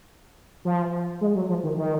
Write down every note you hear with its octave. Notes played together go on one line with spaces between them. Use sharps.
F3
G#3
F#3
F3
D#3
D#3